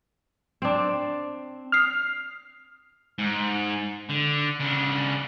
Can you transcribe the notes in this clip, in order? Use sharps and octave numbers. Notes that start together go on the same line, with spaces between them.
C4 D4
D#6 F6 C7
G#2
D3
C#3 D4